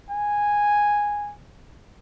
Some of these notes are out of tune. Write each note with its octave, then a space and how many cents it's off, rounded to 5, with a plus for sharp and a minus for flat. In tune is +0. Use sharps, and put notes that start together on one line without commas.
G#5 -5